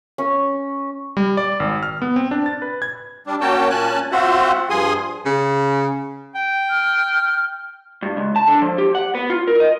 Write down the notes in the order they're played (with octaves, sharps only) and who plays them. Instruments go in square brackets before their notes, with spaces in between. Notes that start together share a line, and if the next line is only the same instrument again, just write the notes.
[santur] C#4
[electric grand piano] G3
D5
G#1
F6
B3
C4
D4
A6
B4
G#6
[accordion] G3 D4
A#3 C#4 F#4 C#5 G5 A5
A#2 C#4 G#5 A5 F#6
C4 F4 F#4 C5 E5 F#5
G2 F3 G#4 G#5 C6 D#6
[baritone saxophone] C#3
[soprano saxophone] G5
[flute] F6
[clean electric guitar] G2
C#2
A5
D3
F3
G4
F#5
B3
F4
A#4
D#5